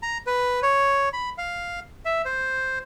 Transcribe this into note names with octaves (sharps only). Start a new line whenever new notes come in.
A#5
B4
C#5
B5
F5
E5
C5